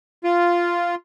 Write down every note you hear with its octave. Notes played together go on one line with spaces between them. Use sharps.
F4